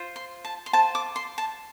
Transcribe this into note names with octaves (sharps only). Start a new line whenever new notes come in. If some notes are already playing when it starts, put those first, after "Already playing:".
Already playing: F4 C5
C6
A5
C6
F4 C5 A5
D6
C6
A5